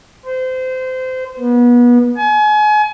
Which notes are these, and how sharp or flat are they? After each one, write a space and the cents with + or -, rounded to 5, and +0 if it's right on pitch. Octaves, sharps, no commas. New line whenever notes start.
C5 -25
B3 -30
G#5 +35